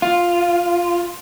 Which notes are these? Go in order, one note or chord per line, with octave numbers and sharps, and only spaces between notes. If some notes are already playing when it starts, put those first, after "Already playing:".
F4